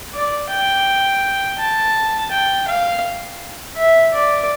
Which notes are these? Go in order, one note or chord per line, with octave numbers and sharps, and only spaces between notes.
D5
G5
A5
G5
F5
E5
D5